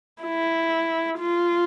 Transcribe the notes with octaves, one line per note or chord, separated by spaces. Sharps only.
E4
F4